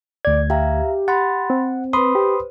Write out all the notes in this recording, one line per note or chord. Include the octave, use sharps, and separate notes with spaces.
D2 D5 G#6
G4 E5 F5 A#5
F#5 B5 C6 A6
C4
B4 C5 B5 C6 D#6
G4